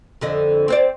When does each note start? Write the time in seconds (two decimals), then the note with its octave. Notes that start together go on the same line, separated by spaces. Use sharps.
0.21 F2 D3 D#5
0.68 C4 C5 D5